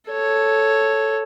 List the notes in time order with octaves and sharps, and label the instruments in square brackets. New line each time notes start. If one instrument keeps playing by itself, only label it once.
[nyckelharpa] A4 C#5